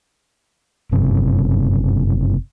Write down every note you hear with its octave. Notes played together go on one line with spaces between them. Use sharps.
F#1 G2 C3